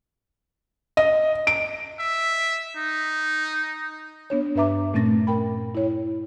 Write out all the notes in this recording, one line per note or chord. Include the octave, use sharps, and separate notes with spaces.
D#5
D7
E5
D#4
B3 D4 C#5
G2 D4 B4 E5 A#5 D6
A#2 A3 C4 C#4 A6 A#6
A#4 G5 B5
E4 C#5